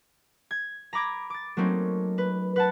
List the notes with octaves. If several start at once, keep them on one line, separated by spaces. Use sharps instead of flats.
G#6
A#5 B5 D6 G#6 A#6
D6 A6
F#3 A3 A#3 C4 C#4 D#4
B4
B4 F#5 A5